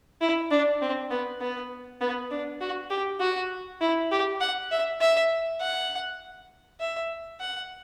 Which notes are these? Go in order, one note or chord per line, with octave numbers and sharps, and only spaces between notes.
E4
D4
C4
B3
B3
B3
D4
F#4
G4
F#4
E4
G4
F#5
E5
E5
F#5
E5
F#5